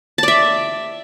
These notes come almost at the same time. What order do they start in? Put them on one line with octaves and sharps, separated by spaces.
A5 D5 E5